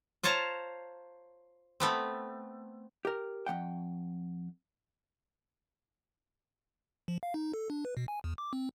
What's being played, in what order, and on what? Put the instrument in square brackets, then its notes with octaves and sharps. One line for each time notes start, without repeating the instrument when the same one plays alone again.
[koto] F4 C5 C#5 A5 A#5
A3 B3 C4
[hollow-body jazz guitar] G4 A#4
F2 F3 F#5 G5
[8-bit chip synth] F3
F5
D#4
A4
D4
B4
B2
G#5
E2
D6
C4